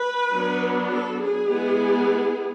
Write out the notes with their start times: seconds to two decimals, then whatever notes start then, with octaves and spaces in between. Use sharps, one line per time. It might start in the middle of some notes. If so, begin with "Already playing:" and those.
Already playing: B4
0.32 F#3 B3 D4
0.90 A4
1.19 G#4
1.48 G#3 B3 E4